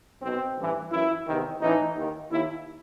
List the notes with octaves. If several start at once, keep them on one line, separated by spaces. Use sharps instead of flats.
B1 B2 C4
A1 G2 E3
F#2 E3 E4
E2 C3 D#3
A1 A2 E3 D#4
D#2 D#3
D#2 D#3 E4